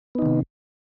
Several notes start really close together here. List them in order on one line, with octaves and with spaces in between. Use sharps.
B3 D#4 D#3 C3